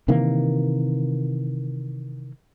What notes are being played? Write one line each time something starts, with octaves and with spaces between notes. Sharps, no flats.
C3 D#3 E3 A#3